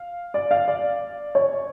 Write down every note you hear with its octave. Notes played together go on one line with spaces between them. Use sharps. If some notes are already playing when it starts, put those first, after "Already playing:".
Already playing: F5
D5
F5
D5
C#5